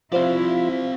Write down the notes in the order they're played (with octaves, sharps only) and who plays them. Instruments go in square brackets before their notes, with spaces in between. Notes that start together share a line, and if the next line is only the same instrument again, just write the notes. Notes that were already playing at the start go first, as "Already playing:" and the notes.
[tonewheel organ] F3 F4 [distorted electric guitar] C4 D5 [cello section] E4 [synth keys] G4 C5 F5